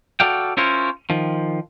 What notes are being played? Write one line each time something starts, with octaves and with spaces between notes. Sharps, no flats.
F#4 A4 D5 F5 G5
C#4 E4 F4 A#4 C5 C#5
D#3 F3